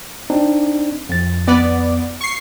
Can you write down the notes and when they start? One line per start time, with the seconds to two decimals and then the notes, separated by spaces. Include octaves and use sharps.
0.30 C4 D4 D#4
1.09 F2 A6
1.47 B3 D5
2.21 C#6 C7